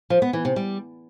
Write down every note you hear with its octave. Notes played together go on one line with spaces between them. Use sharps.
F3
B3
E3
C3
G3